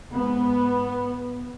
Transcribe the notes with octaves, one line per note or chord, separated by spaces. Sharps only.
G#2 B3